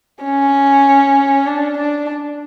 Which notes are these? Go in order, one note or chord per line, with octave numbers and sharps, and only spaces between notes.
C#4
D4
D4